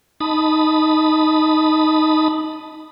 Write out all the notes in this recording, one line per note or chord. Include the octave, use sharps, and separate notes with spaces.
D#4 A5 B5 D#6